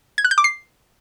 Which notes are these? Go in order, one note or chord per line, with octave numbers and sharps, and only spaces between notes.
G#6
F#6
G6
D6
C7